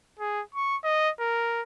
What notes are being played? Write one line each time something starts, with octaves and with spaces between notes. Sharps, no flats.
G#4
C#6
D#5
A#4